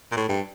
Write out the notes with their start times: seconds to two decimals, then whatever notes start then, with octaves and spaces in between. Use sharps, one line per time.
0.12 A#2
0.17 A2
0.29 G2